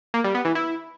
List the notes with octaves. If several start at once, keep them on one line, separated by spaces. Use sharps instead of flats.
A#3
G3
B3
E3
E4